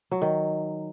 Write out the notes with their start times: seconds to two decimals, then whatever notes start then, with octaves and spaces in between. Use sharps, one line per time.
0.11 F#3
0.22 D#3